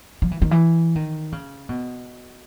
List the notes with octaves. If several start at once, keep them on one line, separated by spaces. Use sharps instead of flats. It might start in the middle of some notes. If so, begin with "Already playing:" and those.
F3
E3
D#3
E3
D#3
C#3
B2